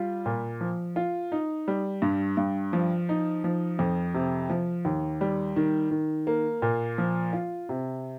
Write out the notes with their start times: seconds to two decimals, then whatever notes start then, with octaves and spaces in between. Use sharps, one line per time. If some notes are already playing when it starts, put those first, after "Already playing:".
Already playing: G3 F4
0.26 A#2
0.61 F3
0.96 F4
1.32 D#4
1.68 G3
2.02 G2
2.37 G2
2.73 F3
3.09 D#4
3.44 F3
3.79 F2
4.14 C3
4.50 F3
4.85 D#2
5.21 G3
5.56 D#3
5.91 D#3
6.27 A#3
6.62 A#2
6.98 F3
7.33 F4
7.69 C3